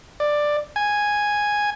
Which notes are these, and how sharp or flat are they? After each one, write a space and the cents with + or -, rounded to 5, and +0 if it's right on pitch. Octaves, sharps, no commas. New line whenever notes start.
D5 +10
G#5 -5